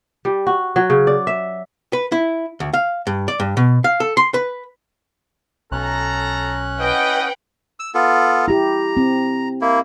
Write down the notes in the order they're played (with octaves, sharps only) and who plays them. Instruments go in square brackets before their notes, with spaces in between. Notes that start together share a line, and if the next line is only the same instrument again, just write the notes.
[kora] G3
F#4
F#3
C#3
D5
E5
[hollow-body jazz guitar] B4
E4
D2
F5
G2
D5
G2
B2
F5
A4
C6
B4
[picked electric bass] B1 [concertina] C#4 F#6 [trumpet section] A4 A#5
[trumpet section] E4 D#5 [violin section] B4 F#5 G5
[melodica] E6
B3 F4 A4
[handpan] E4 G4 [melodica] A#5
[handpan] C4
[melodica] A#3 E4